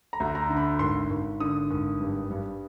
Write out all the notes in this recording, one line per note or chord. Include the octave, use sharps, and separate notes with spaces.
A#5
D2
A#5
D3
B5
G#1 C6
G#1
D3 D#6
G#1
G2
G2